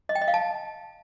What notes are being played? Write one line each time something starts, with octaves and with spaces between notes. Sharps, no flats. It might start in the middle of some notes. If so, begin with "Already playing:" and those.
D#5
G5
D#5
F5
A5